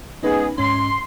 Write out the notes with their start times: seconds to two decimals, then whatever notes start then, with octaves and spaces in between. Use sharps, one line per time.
0.23 G#3 B3 C#4 D#4 G#4 B4
0.58 G#2 C#4 C6